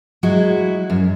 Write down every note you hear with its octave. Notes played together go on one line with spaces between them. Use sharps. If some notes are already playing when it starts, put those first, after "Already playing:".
F#3 G#3 E4 F#4
F#2